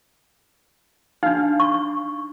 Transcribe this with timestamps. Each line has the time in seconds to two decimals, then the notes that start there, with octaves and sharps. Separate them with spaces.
1.23 D4 D#4 F5
1.60 C#6